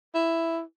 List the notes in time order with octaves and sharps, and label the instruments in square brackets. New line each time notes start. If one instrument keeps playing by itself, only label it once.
[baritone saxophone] E4